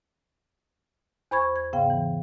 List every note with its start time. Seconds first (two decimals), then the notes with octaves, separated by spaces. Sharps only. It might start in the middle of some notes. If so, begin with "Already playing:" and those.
1.31 E2 C5 B5 C#6 G#6
1.56 G#6
1.73 G#2 C#3 B3 F5 G5
1.90 E3